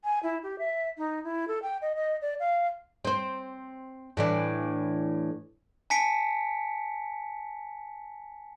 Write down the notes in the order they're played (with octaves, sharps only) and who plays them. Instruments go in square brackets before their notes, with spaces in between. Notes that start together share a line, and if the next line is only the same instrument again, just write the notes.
[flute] G#5
E4
G4
E5
D#4
E4
A4
G5
D#5
D#5
D5
F5
[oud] C4 C5
A2 E3 D4
[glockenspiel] G#5 A5 B6 C#7 D7